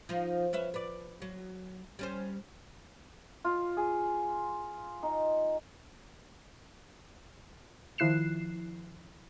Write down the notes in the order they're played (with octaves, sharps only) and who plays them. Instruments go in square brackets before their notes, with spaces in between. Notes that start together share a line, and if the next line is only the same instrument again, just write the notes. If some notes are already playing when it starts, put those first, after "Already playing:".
[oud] F3 D#4 F4
C#4 B4 E5
B4 D5
F#3
G3 C#4 C5
[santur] F4
G#4
D#4
[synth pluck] D#3 F3 E4 F#6 C7 E7